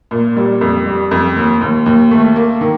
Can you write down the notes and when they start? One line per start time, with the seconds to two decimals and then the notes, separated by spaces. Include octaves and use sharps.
0.11 A#2
0.37 G3
0.61 F2
0.86 G3
1.11 F2
1.36 D#2
1.61 D#2
1.86 D#2
2.11 A3
2.36 A#3
2.61 D#3